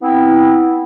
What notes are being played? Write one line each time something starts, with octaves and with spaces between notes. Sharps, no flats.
B3 C4 E4